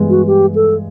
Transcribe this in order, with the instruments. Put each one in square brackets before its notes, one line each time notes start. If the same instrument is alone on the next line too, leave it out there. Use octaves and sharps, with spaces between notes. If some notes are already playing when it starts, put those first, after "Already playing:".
Already playing: [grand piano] G2 E3 G#3 B3
[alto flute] F#4
G4
A4